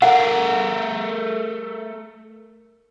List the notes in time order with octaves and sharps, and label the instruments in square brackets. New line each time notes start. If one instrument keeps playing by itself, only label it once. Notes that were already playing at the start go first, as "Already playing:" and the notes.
[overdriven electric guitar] A3 A#4 [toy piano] F#5